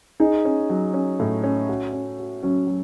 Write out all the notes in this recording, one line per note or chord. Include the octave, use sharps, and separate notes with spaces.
D#4 G#4
C#4
F#3
C#4
A2
C#4
F#4
C#4
F#4
F#3 C#4
F#3